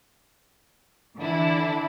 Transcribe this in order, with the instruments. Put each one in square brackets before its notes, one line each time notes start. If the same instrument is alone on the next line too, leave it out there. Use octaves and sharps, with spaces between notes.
[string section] D3 E3 D4 E4